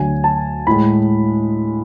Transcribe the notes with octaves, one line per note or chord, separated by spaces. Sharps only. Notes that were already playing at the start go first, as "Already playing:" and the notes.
Already playing: D2 D3 F#3 G#5
A5
A2 G#3 B5